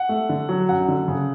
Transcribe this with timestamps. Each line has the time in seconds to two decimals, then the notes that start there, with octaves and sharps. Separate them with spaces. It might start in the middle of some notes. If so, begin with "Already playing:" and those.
Already playing: F#5
0.09 A3
0.29 D3
0.49 F#3
0.69 F#2 F#5
0.88 D3
1.08 C#3